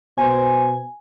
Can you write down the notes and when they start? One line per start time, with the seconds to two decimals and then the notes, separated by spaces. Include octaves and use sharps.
0.18 B2 C5 G#5